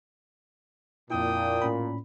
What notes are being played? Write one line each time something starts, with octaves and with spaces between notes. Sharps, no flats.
F2 A#2 D4 E4 G5 D#6
A2 C#4 B5